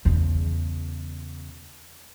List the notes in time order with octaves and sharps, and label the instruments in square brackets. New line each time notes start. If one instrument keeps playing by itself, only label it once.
[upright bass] E2 C#3